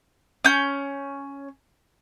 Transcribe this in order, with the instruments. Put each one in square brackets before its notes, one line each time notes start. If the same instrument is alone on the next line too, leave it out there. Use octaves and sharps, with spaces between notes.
[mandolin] C#4 G6